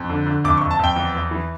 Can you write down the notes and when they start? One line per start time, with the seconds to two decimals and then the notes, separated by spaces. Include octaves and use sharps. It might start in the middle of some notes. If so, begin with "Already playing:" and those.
Already playing: F2
0.09 D3
0.27 D3
0.44 F2 D6
0.57 C#6
0.61 F2
0.71 A5
0.79 F2 G5
0.96 E2
1.14 E2
1.31 E3